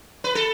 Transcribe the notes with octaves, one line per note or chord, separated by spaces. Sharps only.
B4
A4